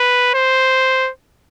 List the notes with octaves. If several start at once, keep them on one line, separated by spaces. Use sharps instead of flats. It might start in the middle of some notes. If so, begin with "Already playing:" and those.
Already playing: B4
C5